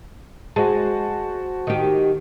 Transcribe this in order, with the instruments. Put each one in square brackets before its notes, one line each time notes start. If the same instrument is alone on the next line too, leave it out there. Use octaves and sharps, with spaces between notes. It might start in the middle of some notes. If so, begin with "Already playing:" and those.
[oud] G#3 [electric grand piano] F#4 C5 A5
[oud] D#3 G4